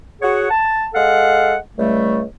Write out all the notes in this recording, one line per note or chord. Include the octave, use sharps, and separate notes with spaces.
F#4 G#4 C#5 F#5
A5
G#3 A4 F5 F#5
C#2 G3 A3